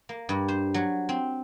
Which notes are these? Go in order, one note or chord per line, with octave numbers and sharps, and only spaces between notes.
A#3
G2
C5
F#3
C4